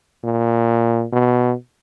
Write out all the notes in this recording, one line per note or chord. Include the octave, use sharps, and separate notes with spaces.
A#2
B2